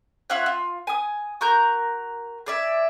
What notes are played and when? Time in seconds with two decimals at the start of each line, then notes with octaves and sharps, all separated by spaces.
0.30 F4 C#5 E5 F#5
0.46 F4
0.87 G#5 D#6
1.41 F#4 A#4 A#5 G6
2.46 G#4 D5 E5